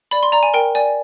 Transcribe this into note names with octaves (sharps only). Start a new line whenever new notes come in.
D5 B5
C6
D5 A#5
G#5
A#4 G5
D5 G#5